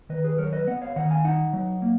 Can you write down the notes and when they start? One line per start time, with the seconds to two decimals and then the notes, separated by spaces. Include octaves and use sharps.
0.09 D#3 B4 D#5
0.24 G#4 B4
0.38 F#3 A#4 C#5
0.53 B4 D#5
0.67 B3 D#5 F#5
0.81 C#5 F5
0.96 D#3 D#5 F#5
1.10 F5 G#5
1.25 D#4 D#5 F#5
1.53 F#3
1.82 A#3